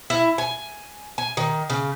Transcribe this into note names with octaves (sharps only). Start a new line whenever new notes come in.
E4
G#5
G#5
D#3
C#3